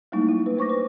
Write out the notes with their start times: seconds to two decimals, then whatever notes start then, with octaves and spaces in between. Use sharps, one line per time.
0.12 F#3 G3 A3 A#3 D#4 E4
0.29 E4
0.44 D4 B4
0.57 A3 C5 C#6 D6 A#6
0.69 B4